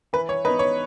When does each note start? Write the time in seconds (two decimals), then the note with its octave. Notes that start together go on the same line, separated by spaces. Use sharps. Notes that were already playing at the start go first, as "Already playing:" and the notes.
0.13 E3 B4
0.29 C#5
0.45 B3 D#4 B4
0.59 C#5